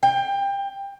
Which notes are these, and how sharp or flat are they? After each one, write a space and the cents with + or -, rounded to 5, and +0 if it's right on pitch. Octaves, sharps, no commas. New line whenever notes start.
G5 +20